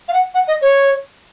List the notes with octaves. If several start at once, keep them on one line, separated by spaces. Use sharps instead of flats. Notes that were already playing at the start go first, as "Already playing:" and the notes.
F5
F#5
F#5
D#5
C#5